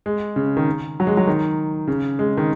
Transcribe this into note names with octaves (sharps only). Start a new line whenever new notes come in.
G#3
C#3
D#3
F#3
G#3
F#3
D#3
C#3
G#3
D#3